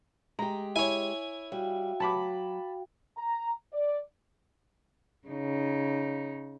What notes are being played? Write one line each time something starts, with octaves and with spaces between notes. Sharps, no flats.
G#3 G4 A#5
E4 C#5 G#5
G3 F#4 F5 G5
F#3 A5 B5 D6
A#5
D5
C#3 D#4